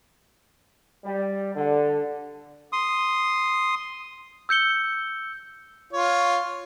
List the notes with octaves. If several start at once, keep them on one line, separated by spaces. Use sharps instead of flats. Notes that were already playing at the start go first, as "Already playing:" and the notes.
G3
D3
C6 D#6
E6 G6 C#7 G7
F4 C#5